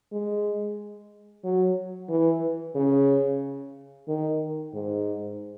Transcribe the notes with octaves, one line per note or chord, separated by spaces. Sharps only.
G#3
F#3
E3
C#3
D#3
G#2